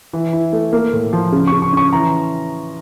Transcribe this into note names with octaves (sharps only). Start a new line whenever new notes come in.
E3
E4
A3
A#3
A2
F3
C#3
C#3 C#6
C#6
C#4 C#6
E3 A#5